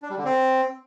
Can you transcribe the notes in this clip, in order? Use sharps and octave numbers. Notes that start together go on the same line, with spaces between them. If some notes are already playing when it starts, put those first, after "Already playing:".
D4
G3
D3
C4